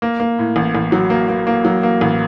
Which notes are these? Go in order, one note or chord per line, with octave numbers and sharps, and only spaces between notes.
A#3
A#3
A2
A1
A1
F#3
A#3
A#3
A#3
F#3
A#3
A1